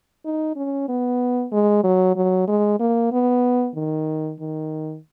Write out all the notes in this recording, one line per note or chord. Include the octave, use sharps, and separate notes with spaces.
D#4
C#4
B3
G#3
F#3
F#3
G#3
A#3
B3
D#3
D#3